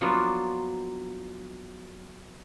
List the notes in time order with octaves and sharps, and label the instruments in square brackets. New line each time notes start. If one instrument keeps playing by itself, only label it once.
[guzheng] F3 F#3 A#3 B3 D4 F4